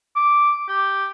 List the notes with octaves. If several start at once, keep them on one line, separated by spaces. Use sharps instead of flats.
D6
G4